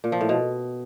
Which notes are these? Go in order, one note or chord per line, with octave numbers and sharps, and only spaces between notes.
A#2
F3
A2
B2